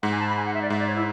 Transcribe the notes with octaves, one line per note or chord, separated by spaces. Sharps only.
G#2 F#5
G#5
A5
B5
G#5
F#5
E5
D5
G#2 E5
D5
C#5
E4